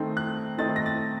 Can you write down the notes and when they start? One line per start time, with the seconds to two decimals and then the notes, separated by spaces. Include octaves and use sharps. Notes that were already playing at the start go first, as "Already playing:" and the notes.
Already playing: D#3 A3 C4 D#4
0.17 F#6
0.58 D#3 A3 C4 D#4 A6
0.76 A#6
0.86 A6